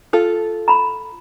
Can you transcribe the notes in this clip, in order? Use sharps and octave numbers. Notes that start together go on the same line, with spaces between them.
F4 A4
A#5 B5